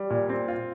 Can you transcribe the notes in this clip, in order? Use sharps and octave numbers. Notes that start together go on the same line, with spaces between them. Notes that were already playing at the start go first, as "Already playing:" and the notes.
Already playing: G3
A#2
C4
F4